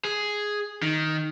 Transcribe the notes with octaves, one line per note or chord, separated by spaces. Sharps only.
G#4
D#3